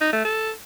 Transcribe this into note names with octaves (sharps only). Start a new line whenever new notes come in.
D#4
A3
A4